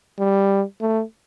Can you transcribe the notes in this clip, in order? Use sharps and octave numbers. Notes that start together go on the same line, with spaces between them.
G3
A3